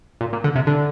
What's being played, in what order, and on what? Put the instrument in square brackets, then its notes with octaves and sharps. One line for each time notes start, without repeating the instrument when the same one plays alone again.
[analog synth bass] A#2
A#2
D3
C3
D3